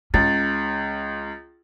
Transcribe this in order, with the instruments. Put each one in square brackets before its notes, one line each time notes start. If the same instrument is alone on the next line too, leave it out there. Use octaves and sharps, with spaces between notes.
[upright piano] C#2 [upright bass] C#4 [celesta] A6